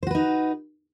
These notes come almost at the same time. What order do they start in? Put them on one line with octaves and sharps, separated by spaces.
C5 F#4 B4 D#4